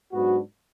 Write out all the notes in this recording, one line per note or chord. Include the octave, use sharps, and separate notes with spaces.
G#2 F#3 B3 D4 F#4